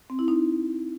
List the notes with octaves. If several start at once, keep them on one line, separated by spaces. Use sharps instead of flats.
C4
E4
D#4